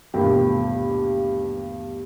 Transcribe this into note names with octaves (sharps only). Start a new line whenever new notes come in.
D#1 A1 G2 B2 A#3 G5